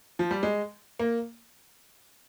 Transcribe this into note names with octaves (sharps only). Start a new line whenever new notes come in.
F3
G3
G#3
A#3